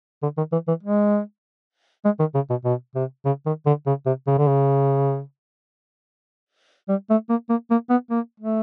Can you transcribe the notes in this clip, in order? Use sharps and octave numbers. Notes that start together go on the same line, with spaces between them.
D3
D#3
E3
E3
G#3
G#3
D#3
C#3
B2
B2
C3
C#3
D#3
D3
C#3
C3
C#3
D3
C#3
G3
A3
A#3
A#3
A#3
B3
A#3
A3